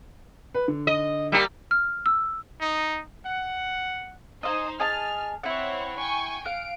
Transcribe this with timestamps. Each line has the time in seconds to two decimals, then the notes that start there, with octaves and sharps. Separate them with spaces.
0.54 B4
0.68 D3
0.87 D#5
1.32 G3 A#3 G4 A#5 E6
1.71 F6
2.06 E6
2.61 D#4
3.26 F#5
4.43 D#4 C5 D#5 F5 G#5
4.80 G#4 D#5 A5 F6
5.44 C4 E4 C#5 F#5
5.99 G5 G#5 C#6
6.45 F5 F#5 D7